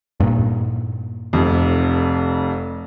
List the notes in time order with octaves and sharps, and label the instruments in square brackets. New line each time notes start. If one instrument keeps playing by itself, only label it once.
[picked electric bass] G2 A#2
[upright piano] F1 F2